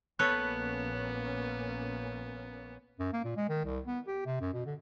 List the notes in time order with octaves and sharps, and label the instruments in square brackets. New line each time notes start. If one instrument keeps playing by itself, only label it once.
[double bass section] A#1 A#3 C#4 [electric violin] B3 [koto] A4 B4 C#5 [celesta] F#6
[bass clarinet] F#2
A#3
A#2
G#3
D#3
C2
B3
G4
C3
F#2
B2
D3